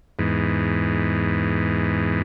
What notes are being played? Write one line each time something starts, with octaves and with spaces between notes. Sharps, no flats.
E2 G#2